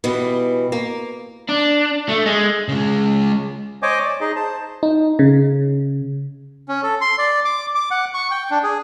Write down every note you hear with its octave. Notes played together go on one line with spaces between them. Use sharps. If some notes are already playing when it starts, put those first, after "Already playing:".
B2 E3 G3
A#3
D4
A3
G#3
C#3 G#3
C5 C#5 D#5 G#5 D6
D5
D#4 G#4 D#5
C5 A5
D#4
C#3
C#4
A4
C6
D5
D6
D6
F#5
C#6
G5
D4
G#4